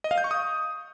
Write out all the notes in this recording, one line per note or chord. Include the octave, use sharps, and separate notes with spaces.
D#5
F5
G6
C#6
D#6